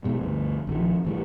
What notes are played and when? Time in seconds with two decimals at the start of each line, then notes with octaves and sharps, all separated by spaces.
0.04 G#2 B2 G3
0.21 D2 G2
0.67 A#1 D#3 F3
1.05 A1 E3 G3